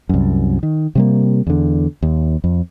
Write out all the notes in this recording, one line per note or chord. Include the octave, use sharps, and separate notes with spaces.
C2 F#2
D#3
C3 G3 A#3
E2 D3
D#2
F2